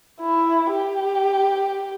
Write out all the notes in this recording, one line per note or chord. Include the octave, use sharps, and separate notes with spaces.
E4
G4